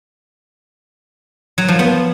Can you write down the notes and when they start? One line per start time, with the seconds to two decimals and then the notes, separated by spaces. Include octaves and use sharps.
1.58 F#3
1.68 F3
1.79 B3